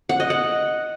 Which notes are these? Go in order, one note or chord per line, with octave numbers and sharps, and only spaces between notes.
F#5
D#5
F#5